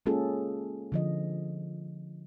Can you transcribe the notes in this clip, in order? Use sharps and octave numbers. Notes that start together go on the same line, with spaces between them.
G#3 A#3 C#4 F4 G#4 A4
D3 F3 D#5